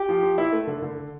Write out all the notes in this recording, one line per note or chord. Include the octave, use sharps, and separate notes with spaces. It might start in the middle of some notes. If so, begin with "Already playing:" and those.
Already playing: G4
F3
F3
E4
A3
D3
D3